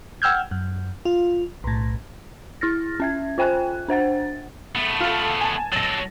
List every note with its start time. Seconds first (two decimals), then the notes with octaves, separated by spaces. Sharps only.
0.22 F#5 G5 E6 F6 G6 G#6
0.51 F#2
1.05 F4
1.64 B1 A2
2.61 E4 F6 A6 A#6
3.00 C#4 E5 G#6
3.38 F4 C5 G5 G#5 F#6
3.88 D4 C5 F#5 A6
4.75 A3 B3
5.00 F4 A4
5.41 G#5 A5
5.72 F#3 A4 A6 A#6